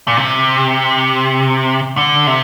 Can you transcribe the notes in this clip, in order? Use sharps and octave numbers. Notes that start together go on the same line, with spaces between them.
A#2
C3
D3
C3